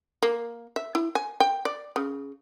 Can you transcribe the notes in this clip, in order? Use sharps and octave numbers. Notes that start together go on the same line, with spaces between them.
A#3
E5
E4
G#5
G5
D5
C#3